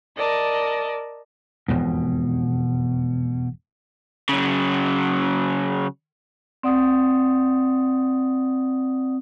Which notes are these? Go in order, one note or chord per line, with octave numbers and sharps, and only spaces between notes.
A#4 D5 D#5 A5
E1 F2 G#2 B2
C#3 F#3
C4 D5 F#5 D#6